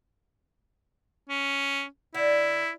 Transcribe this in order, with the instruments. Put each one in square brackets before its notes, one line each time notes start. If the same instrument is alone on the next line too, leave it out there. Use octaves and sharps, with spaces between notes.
[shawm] C#4
[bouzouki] D3 [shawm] E4